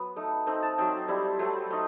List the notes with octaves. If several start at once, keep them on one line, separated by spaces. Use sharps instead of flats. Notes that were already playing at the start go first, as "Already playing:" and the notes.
Already playing: F#3 B3
A3 D#4
A3 C4 D#4
A5
F#3 C4 D#4 G5
G3 C4 E4
F#3 A3 C4
A3 D#4